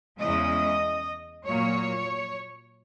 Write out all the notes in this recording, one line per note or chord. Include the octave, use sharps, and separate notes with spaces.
E2 C#3 G#3 C#4 E4 D#5
A#2 F#3 A#3 C#5